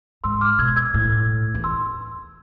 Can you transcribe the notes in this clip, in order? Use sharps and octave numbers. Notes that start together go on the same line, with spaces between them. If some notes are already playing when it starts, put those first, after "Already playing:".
G#2 C6 E6
D6 F6
B2 E6 G#6
E6 G#6
A2
E2
C6 E6